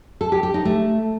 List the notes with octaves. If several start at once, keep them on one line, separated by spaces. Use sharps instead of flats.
A4
G4
G4
D#4
A3